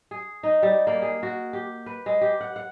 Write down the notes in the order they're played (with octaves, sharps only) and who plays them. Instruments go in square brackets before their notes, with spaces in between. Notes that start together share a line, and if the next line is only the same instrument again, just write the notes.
[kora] G#4
D#4
G3
A#3
G#4
F#4
G4
B4
G#3
G4
F#5
F#5